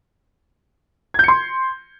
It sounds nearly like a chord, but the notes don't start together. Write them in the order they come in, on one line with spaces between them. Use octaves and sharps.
G#6 G6 C#7 C6